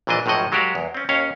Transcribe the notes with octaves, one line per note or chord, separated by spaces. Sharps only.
A#1 A#2 E3 D4 D#5
G#1 A2 F3 F#3 D#5 F#5
F#3 G#3 F#4 G4 A#4 F5
E2
C4 C#4
D#2 C#4 C#5 F5